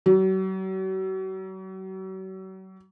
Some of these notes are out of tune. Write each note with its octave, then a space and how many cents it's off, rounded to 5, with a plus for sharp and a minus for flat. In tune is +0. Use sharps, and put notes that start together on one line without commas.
F#3 +40